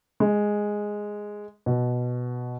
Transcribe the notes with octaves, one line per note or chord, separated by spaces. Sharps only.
G#3
B2